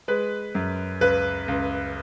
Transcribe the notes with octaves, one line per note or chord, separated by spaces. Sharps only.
G#3 B4
F#2
C#2 B4
C#2